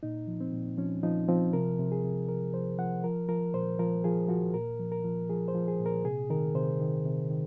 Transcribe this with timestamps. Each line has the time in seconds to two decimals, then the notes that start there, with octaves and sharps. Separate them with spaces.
0.03 A#2 D#4
0.27 F3
0.41 C4
0.54 A#2
0.78 F3 C#4
1.03 F3 D#4
1.28 F3 C4
1.53 C3 A#4
1.79 C3
1.92 G#4
2.04 C3
2.28 F3 A#4
2.54 F3 C5
2.79 F3 F#5
3.04 F3 A#4
3.29 F3 A#4
3.54 A#2 C5
3.79 F3 A#4
4.04 F3 G#4
4.29 F3 F#4
4.54 A#2 A#4
4.79 F3
4.92 A#4
5.04 F3
5.30 F3 G#4
5.48 C5
5.55 F3
5.68 G#4
5.80 A#2
5.86 A#4
6.04 C3 G#4
6.30 D#3 A#4
6.55 C3 C5
6.80 D#3
7.05 C3
7.30 D#3